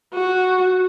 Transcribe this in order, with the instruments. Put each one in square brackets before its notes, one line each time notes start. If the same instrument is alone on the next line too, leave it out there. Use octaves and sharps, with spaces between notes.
[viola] F#4